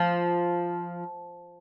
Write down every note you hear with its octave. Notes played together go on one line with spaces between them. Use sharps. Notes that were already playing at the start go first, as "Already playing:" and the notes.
Already playing: F3